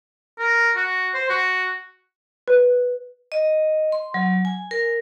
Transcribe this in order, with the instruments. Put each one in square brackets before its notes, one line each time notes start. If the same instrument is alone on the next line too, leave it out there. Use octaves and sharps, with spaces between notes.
[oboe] A#4
F#4
C5
F#4
[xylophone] B4
[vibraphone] D#5
C6
F#3
G#5
A#4